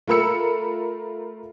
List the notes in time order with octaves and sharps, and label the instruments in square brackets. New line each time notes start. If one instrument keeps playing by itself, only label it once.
[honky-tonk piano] A3 F4 A#4 B5 E6 C#7